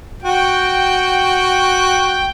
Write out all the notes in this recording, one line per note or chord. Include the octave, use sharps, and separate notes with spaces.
F#4 G5